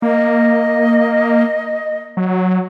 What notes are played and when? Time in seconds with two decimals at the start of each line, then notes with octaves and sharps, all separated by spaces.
0.02 A#3 D#5
2.17 F#3